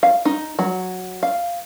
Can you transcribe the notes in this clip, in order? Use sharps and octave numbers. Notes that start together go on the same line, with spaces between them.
F5
D#4
F#3
F5